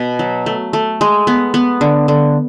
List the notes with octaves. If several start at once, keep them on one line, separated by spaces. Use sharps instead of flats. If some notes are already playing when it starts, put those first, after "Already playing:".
Already playing: B2
F#3
A3
A3
G#3
B3
B3
D3
D3